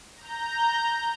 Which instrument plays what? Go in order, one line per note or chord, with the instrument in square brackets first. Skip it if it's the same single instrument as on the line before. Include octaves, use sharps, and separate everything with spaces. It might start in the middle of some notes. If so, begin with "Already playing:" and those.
[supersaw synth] A#5 G6